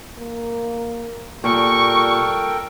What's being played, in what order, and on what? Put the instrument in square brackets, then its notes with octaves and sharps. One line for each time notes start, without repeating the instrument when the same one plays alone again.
[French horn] A#3
[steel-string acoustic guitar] A#2 [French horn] G3 [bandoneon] A4 A#4 G5 [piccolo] C#6